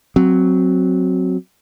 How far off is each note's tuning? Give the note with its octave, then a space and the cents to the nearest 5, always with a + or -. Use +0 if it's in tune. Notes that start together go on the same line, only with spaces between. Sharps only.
F#3 +0 C4 +0